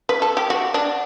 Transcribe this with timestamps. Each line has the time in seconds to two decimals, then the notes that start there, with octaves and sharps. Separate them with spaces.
0.09 B4
0.22 A4
0.37 G4
0.50 F#4
0.74 D4